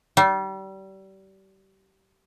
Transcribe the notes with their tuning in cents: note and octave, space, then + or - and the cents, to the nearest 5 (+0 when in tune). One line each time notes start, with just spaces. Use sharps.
G3 -30